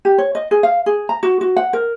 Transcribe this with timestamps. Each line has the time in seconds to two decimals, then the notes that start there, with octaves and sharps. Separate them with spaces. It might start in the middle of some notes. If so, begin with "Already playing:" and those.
0.05 G4
0.18 C#5
0.35 D#5
0.51 G#4
0.63 F5
0.86 G#4
1.09 A#5
1.23 F#4
1.41 F#4
1.56 F#5
1.73 A#4